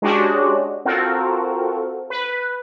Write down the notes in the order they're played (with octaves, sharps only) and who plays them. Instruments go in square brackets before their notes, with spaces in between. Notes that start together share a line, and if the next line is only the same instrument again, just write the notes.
[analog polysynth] G#3 C#4 D4 F#4 G4
C4 F4 F#4 A4 A#4
B4